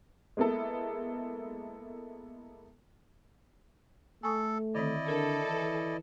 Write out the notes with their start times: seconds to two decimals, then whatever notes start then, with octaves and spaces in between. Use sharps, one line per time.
0.37 G#3 A#3 B3 E4 A4
4.23 A3 A4 G#5 C#6 D#6
4.75 D3 D#3 C4 E4 D5 D#5
5.08 D3 A4 A#4
5.46 E3